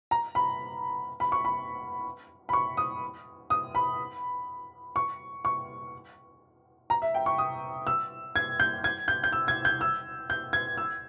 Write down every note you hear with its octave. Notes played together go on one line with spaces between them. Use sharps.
A#5
B5
B5
C#6
B5
B5
C#6
D#6
D#6
B5
C#6
C#6
A#5
E5
G5
C#6
D#6
E6
G#6
G6
G#6
G6
G6
E6
G#6
G6
E6
G6
G#6
E6